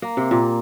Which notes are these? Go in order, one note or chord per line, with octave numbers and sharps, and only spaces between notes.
A#3
C3
A#2